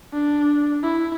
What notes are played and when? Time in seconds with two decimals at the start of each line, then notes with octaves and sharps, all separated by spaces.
0.13 D4
0.83 E4